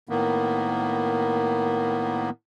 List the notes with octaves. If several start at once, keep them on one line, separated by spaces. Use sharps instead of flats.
A2 D#3 A#3 B3